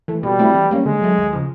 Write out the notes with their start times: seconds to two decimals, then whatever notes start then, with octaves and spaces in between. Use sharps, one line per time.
0.08 E3 A3
0.23 B2 G3
0.39 F#3 A3 C4 E4
0.54 E3
0.71 G3 A#3 C#4
0.86 D3 G#3
1.02 F#3 A3
1.18 D#2
1.33 C#3 F3